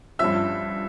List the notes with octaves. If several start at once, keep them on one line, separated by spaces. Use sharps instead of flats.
G2 F3 C#4 F4 E5 E6